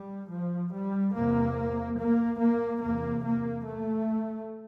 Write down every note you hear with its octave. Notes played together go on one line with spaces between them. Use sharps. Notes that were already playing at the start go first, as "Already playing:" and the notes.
Already playing: G3
F3
G3
E2 C3 A#3
A#3
A#3
E2 C3 A#3
A#3
A3